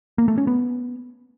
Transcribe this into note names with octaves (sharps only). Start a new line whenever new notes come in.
A#3
A3
C#4
B3